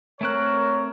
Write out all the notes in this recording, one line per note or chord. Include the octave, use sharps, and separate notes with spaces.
A3 C4 A#4 C#5 F#6